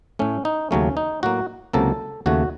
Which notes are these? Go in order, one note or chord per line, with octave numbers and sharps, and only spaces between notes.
A2 A3 C#4
D#4
D#2 C#3 F#3 A3 C#4
D#4
A2 F#3 A#3 F#4
C#2 C3 F#3 A#3 A4
D#2 C#3 A3 F#4